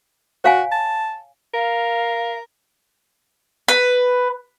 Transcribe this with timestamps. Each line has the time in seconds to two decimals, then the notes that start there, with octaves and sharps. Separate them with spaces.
0.44 F#4 C#5 F5 G#5
0.72 A5
1.54 A#4 F5
3.68 B4